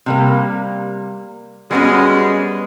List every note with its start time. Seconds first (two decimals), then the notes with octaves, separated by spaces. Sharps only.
0.06 C3 G3 A#3
1.71 F#2 G3 G#3 B3 C#4